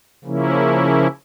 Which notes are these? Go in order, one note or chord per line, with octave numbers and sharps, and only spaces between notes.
C#3 F3 A#3 C#4 E4